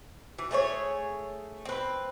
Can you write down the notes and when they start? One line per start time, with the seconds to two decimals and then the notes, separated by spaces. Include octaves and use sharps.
0.39 E3
0.51 A3 G#4 C5 C#5
1.65 C4 B4